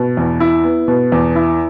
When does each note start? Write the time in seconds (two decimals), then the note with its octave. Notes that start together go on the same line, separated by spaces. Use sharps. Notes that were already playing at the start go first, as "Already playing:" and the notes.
Already playing: B2
0.17 E2
0.40 E4
0.64 B3
0.88 B2
1.12 E2
1.36 E4